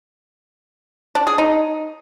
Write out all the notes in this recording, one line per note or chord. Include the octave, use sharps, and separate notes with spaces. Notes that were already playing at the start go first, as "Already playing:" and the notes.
D4
G#4
D#4